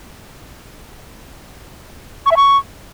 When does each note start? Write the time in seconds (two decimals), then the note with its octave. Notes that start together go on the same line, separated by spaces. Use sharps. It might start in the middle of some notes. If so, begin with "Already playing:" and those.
2.26 C#6
2.31 E5
2.36 C#6